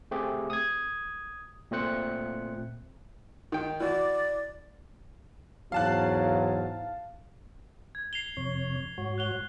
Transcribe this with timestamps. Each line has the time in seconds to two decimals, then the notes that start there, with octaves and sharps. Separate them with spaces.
0.11 A3 C4 G4 G#4
0.50 D#6 G#6
1.71 A#2 A3 C4 C5 F#6 C#7
3.52 D#3 G5
3.80 E3 F#4 D5
5.72 E2 G#2 F#3 F5 A5 F#6
7.95 G#6
8.13 C7 F7 G7
8.37 F2 C3 C#5
8.98 G#2 F#4 C#5
9.18 F#6 F7 G7